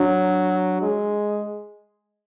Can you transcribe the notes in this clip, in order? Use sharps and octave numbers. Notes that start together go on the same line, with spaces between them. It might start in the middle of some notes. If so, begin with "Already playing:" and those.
Already playing: F#3 D4
G#3